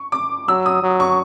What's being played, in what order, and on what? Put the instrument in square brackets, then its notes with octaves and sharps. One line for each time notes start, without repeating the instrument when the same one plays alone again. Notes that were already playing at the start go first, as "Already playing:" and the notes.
Already playing: [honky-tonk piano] C#6
D6
[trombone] F#3 [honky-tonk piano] E6
[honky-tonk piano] D#6
[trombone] F#3
[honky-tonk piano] C#6